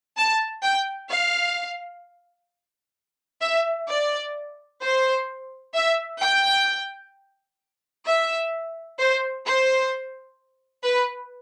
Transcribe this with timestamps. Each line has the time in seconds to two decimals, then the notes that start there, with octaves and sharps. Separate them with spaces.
0.18 A5
0.63 G5
1.09 F5
3.41 E5
3.88 D5
4.81 C5
5.74 E5
6.21 G5
8.05 E5
8.99 C5
9.45 C5
10.84 B4